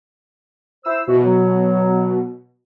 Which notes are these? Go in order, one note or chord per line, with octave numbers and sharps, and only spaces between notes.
E4 C5 E6
B2 E3 F#4
F#3